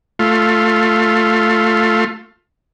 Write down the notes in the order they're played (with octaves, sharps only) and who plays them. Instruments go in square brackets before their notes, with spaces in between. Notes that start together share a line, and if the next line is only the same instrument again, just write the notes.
[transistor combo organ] A3 F4